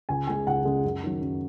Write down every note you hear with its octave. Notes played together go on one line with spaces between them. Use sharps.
C#2 G#5
C#3 G#3 G#5
C#2 F#5
C#3 G#3
F#2
D#3 F#3
F#2